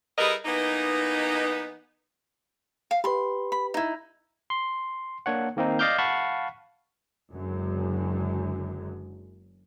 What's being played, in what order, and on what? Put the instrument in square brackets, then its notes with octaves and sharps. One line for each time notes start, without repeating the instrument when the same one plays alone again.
[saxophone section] G3 E4 G#4 A#4 B4 D#5
E3 A#3 B3 D#4
[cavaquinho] F5
[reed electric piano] G4 B4 [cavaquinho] B5 C6
[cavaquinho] B5
D#4 E4
[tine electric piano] C6
A#3 D4 C#5 F#5
D#3 A#3 C4 D#4
D5 D#5 F5 D6 F6 G6
F5 F#5 A5 B5 C#6
[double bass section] F#1 F#2 D3 G#3